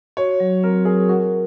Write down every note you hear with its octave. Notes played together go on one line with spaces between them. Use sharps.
F#4 C#5
F#3
C4 A#4
G#4 A#4
F#4 A#4